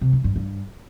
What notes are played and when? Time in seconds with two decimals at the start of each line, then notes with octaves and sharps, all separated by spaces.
0.01 C3
0.13 E3
0.24 G2
0.36 G2